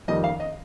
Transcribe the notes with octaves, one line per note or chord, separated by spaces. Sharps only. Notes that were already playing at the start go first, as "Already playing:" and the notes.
F2 D#3 G3 D#5
F5
D#5